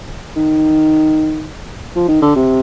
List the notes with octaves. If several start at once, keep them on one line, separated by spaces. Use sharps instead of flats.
D#3
F3
D#3
D3
C3